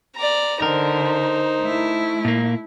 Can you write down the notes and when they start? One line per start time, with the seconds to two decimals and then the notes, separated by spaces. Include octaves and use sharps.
0.16 D5 A#5
0.62 D3 D#4 A#4 C5
1.62 A3 E4
2.25 A#2 A#3